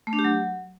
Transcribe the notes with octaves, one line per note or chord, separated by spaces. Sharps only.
A3
D4
G4
F#3